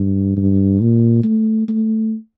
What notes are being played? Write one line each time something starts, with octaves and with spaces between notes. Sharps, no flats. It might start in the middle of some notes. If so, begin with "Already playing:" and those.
Already playing: G2
G2
A#2
A3
A3